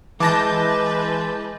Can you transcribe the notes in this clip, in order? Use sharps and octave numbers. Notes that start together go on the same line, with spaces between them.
E3 G#3 B4 A5 D6 G6 A#6